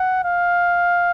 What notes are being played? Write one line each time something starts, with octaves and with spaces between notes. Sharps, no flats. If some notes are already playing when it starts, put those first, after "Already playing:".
Already playing: F#5
F5